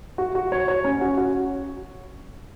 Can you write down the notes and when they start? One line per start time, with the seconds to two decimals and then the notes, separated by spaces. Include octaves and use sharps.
0.18 F#4
0.35 F#4
0.52 C#5
0.68 C#5
0.84 C#4
1.01 F#4
1.18 F#4